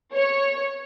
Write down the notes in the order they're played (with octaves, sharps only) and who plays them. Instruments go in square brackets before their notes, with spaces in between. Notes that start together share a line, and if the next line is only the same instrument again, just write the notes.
[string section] C#5